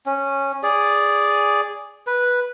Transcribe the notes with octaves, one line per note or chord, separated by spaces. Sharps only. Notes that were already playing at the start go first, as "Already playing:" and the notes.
C#4
G#4 D5
B4